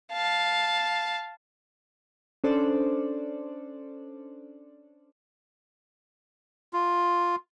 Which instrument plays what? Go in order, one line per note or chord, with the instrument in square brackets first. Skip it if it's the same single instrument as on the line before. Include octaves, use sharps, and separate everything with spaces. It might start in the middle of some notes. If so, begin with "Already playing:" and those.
[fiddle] F5 A5
[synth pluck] C#4 D4 A4 C5 D5
[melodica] F4